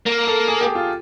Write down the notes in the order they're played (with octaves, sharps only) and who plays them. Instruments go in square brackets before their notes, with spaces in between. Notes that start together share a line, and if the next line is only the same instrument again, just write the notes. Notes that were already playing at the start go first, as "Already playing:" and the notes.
[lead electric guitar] A#3 [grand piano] A#4
[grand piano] A4
G#4
G4
F4